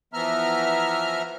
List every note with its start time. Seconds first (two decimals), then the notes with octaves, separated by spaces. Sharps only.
0.13 E3 F3 B3 E5 A#5 F6